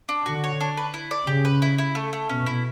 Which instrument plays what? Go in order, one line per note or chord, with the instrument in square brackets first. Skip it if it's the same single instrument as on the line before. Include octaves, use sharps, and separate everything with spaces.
[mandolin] D4
[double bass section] D3 [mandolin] F#4
[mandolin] C#5
D4
B4
E4
D5
[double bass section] C#3 [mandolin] G4
[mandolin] B4
E4
E4
A3
A3
[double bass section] B2 [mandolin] C#4
[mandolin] E4